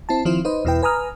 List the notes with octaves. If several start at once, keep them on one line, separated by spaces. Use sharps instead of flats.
C4 E4 A5
D#3 F3 C4 E4 F4 C5
D#4 B4 C5 D#5
E2 B2 E4 B4 G5
B4 G#5 A#5 D#6 F6